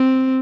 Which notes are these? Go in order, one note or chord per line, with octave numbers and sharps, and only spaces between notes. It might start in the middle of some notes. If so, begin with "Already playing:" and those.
Already playing: C4